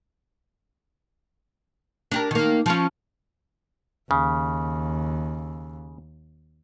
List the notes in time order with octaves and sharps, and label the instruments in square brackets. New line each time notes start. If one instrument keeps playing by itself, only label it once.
[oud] D4 G4 A#4
D#3 A#3
F3 C#4
[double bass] D#2 [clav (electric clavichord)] C#3